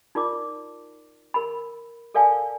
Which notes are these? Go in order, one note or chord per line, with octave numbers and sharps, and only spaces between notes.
D#4 F4 A#4 D5 D6
A#4 B5
A4 A#4 D5 F5 G#5 A5